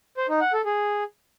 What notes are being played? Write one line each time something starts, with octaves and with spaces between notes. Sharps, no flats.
C5
D#4
F#5
A4
G#4